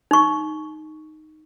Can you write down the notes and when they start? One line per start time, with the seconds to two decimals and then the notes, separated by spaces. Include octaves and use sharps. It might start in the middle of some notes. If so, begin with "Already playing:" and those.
0.11 D#4 C#6